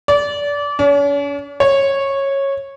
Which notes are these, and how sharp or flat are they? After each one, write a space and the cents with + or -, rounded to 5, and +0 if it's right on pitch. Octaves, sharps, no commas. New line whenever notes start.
D5 -25
C#4 +45
C#5 -15